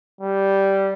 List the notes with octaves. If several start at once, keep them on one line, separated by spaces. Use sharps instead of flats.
G3